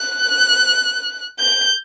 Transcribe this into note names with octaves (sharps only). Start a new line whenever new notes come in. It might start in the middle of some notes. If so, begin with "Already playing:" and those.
Already playing: F#6
G6